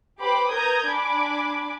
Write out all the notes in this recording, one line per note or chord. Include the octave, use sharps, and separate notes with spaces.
G4 B4 C5 G5 B5 D6
A#4 B4 A#5 D#6 G6 G#6
D4 G#5 B5 D6